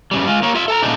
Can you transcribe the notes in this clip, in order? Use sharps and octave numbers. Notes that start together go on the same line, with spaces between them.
F#2 C#3 G3
G#3 F4
A#3 A#4 C#5
F4 E5
A4 A5 A#5
A#2 C#3 A3 D4 D#4